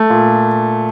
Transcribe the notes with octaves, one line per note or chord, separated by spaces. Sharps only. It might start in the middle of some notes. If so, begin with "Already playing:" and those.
Already playing: A3
A#2